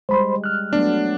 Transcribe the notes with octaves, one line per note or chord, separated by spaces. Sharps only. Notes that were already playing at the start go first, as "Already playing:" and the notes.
G3 G#3 C5 B5 C6
F6 F#6
F#3 A3 B3 D4